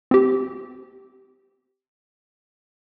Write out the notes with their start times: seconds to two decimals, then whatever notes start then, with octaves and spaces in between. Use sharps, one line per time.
0.11 C4 G4